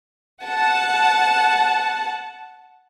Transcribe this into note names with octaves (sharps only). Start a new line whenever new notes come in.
F#5 A5